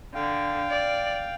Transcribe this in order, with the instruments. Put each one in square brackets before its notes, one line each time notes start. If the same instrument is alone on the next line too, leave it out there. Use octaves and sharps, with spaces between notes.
[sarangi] D3 [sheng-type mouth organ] F5 G5
[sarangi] D5